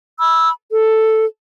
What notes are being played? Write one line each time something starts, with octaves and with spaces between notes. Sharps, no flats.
B5 E6
A4